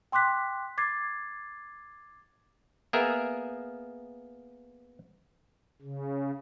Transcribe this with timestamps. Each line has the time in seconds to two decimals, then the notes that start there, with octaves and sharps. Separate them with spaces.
0.12 G5 C6 D6 F#6 B6
0.78 D6 G#6 A6 C7
2.93 A#3 B3 G#4 A#4 E5
5.82 C#3